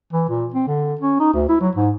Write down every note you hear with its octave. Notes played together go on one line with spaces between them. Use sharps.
E3
A#2
C4
D3
C#4
D#4
D2
E4
F#3
G#2